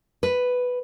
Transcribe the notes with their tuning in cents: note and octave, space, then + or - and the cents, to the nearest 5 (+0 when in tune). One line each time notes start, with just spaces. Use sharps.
B4 +5